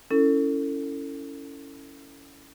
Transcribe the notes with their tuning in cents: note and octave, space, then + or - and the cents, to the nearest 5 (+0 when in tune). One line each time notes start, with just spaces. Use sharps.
C#4 +15 E4 +0 A4 +30